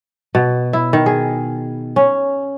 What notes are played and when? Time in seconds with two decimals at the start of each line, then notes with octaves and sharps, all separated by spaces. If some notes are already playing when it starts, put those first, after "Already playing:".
0.35 B2
0.73 E4
0.93 D#3
1.06 G#4
1.96 C#4